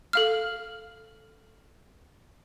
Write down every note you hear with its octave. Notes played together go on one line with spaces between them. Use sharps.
A4 F5 F6